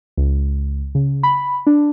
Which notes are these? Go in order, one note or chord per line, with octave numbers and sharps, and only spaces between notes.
C#2
C#3
B5
D4